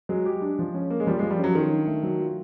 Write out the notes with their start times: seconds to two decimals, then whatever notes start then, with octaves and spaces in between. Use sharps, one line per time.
0.09 F#3 G#3
0.25 G4
0.42 D4
0.59 F3
0.74 C#4
0.90 A#3
1.00 G#3
1.07 F3 G3
1.19 G#3
1.23 F3
1.30 G3
1.39 C#4
1.44 F#3
1.55 D#3 F4
1.71 D4
1.87 A3
2.03 F#3
2.20 F4